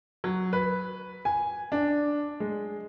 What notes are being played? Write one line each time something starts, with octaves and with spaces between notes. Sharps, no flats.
F#3
B4
G#5
D4
G#3